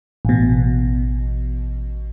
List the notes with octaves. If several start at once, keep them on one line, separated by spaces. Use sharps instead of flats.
A1 B2